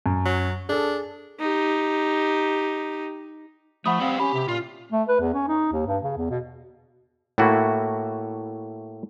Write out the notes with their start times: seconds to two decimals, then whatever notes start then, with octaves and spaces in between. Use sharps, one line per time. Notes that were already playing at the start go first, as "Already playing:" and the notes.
0.06 F#2
0.25 F#3
0.69 D4 G#4 A4
1.40 D#4 G4
3.86 F3 A3 F#5 B5 D#6
4.00 G3 C4 F5
4.20 C#4 G4 B5
4.34 C3
4.48 A#2 F4
4.92 A3
5.08 B4
5.20 E2
5.34 C#4
5.48 D#4
5.72 D#2
5.86 G2
6.03 C#3
6.17 E2
6.30 B2
7.38 A2 A3 A#3 E4 F#4